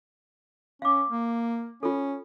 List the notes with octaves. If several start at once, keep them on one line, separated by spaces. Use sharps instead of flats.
C#4 F5 D6
A#3
C#4 F4 A4